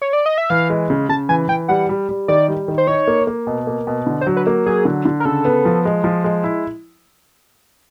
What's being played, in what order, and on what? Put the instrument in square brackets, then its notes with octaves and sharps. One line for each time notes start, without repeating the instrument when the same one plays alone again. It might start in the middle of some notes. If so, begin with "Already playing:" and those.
[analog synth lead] C#5
D5
D#5
E5
[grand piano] E3 [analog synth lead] F5
[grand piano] G#3
C#3
[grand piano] C#3 [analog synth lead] A5
[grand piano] E3 [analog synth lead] G#5
[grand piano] E3 [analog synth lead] G5
[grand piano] G3 [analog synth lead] F#5
[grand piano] G3
G3
[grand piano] D#3 [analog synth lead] D5
[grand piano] G3
D#3
[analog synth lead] C5
[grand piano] D#4 [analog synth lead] C#5
[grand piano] A#3
A#3
B2
A#3
B2
D3
[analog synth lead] C5
[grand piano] F#3
[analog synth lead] B4
[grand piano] A#3
[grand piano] F#3 [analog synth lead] G#4
[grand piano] D3
D3
[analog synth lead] A#4
[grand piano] C#3 [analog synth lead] A4
[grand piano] B3
F3
G#3
F3
G#3
E4